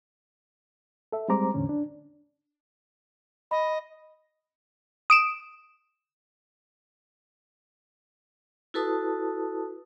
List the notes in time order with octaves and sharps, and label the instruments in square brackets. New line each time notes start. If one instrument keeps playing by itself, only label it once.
[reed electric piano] A4 E5
G3 G#3 C4 C5 A#5 D6
E2 A2 D3 C#4
D4
[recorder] D#5 [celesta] B5
[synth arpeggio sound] D#6 D7 E7
[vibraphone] E4 F#4 A4 B4 A5 D#6